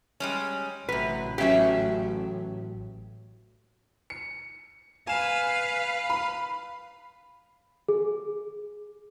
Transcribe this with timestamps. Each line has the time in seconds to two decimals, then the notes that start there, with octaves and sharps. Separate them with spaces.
0.20 G3 G#3 C#4
0.89 A1 C3 F#3 B4
1.38 C#3 F#3 C#4 G4 E5
4.10 C#7
5.07 B4 F5 G#5 E7
6.10 B5
7.89 G#4